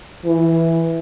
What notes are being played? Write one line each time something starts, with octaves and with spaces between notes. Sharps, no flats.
E3